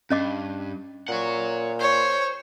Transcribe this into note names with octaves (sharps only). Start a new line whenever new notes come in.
G2 C#4 D#5 D6
A#2 C#5 F#5
C5 C#5